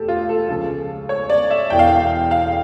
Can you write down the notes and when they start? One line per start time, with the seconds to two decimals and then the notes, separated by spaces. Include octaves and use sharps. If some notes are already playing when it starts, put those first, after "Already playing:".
Already playing: E1 D2 G4 A4
0.08 F4
0.29 A4
0.49 C#2 C#3 F3 A4
1.09 C#5
1.30 D5
1.50 E5
1.70 E1 E2 E3 G5
1.79 F5
1.87 G5
2.31 F5